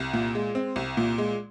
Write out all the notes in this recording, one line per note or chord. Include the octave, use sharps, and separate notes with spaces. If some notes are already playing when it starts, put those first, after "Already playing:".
Already playing: C2
A#2
G#3
C4
C2
A#2
G#3